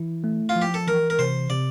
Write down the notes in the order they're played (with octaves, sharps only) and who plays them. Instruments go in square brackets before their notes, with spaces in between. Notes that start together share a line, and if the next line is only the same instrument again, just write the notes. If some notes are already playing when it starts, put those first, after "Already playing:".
Already playing: [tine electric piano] E3 E4
A3
[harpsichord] F4
[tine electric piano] F3
[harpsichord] G4
A4
[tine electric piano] E3 [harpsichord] A#4
[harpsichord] A#4
[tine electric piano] C3 [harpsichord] C5
[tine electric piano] C3 [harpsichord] D5